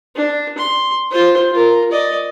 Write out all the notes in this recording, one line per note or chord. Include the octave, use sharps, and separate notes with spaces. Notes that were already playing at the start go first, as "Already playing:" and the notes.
D4
C6
F4 C5
F4 A#4
D5 D#5